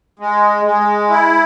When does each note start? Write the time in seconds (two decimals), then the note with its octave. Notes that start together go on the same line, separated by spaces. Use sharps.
0.19 G#3
0.65 G#3
1.10 E4